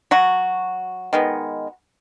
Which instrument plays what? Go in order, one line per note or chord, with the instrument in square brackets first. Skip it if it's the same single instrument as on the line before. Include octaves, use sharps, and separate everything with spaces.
[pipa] F#3 F#4
D#3 G#3 B3